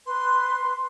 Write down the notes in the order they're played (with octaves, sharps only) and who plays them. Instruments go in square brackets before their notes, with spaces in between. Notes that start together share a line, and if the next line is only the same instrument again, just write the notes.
[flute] B4 [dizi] C6